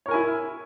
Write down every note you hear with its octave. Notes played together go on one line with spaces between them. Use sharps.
E4 A#4 C#5 G#5